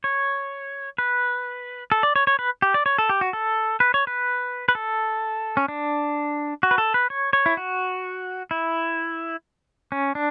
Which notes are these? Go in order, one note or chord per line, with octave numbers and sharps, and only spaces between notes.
C#5
B4
A4
D5
C#5
C#5
B4
G4
D5
C#5
A4
G4
F#4
A4
B4
C#5
B4
B4
A4
C#4
D4
F#4
B4
A4
B4
C#5
C#5
E4
F#4
E4
C#4
D4